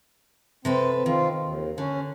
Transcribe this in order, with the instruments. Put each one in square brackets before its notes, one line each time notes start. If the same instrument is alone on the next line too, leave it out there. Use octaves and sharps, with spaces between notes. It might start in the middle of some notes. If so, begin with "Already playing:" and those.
[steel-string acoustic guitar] C3 A4 B4 [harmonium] C4
[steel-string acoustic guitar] D#3 [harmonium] C4 F4
[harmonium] D#2
[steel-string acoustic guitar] D3 [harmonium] C#4